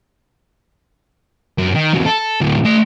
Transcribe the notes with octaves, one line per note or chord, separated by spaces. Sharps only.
F#2
D#3
E2 F#3
A4
D2 A2
A3 C6